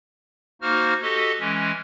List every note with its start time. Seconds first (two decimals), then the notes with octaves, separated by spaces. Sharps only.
0.62 A#3 D#4 F#4 C5 F6
1.02 F#4 G4 A4 D#5
1.39 E3 G#3 C#4